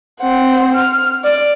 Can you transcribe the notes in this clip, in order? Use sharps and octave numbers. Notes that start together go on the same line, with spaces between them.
C4 F#5
F6
D5